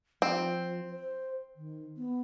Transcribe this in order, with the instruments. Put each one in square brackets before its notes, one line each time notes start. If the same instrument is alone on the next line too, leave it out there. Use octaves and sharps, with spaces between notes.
[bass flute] F3 [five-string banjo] C4
[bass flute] C5
D#3
B3